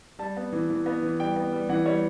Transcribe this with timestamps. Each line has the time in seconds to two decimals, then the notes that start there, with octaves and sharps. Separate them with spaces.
0.19 G3 A5
0.37 B3
0.52 E3
0.70 E3
0.86 B3
1.03 E3
1.19 G3 G5
1.36 B3
1.53 G3
1.69 E3 F#5
1.86 G3 C#5